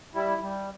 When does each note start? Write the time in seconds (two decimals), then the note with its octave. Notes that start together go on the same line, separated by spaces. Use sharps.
0.15 G3 E4
0.42 G3